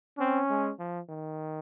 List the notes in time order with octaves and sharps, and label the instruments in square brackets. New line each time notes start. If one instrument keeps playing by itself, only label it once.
[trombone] C4 [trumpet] C#4
[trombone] G#3
F3
D#3